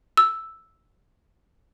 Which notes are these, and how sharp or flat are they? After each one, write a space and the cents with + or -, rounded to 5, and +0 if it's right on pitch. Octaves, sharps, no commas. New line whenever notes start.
E6 +0